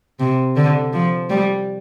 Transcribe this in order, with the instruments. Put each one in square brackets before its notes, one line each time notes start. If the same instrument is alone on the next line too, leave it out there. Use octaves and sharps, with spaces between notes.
[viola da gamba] C3
D3
F3
G3